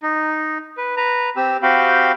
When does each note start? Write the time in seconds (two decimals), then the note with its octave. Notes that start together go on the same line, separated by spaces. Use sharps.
0.03 D#4
0.77 B4
0.97 B4 A#5
1.37 C4 G4 E6
1.63 C4 F#4 G4 F5 G5 B5